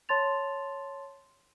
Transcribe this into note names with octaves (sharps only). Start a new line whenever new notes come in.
C#5 A5 C6 A6 F7